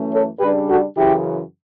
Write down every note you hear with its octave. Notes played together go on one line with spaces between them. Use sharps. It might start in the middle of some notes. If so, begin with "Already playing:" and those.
Already playing: F#2 E3 A3 C#4
A4 C#5
C#3 G3 D4 G4 B4
F#4 A4
F#2 C#3 E3 E4 G4